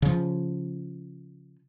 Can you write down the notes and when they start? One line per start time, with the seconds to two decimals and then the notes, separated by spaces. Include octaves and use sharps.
0.02 C#3 F3